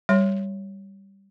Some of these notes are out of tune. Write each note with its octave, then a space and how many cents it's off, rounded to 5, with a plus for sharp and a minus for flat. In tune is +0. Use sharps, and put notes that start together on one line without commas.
G3 +0 C#5 +0 C6 +0